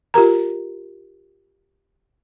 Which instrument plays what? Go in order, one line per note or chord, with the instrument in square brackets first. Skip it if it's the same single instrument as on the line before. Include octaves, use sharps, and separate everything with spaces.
[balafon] F4 G4 A#4 A#5